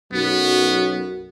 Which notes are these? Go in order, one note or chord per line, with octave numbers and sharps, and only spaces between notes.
B1 F#2 B3 F#4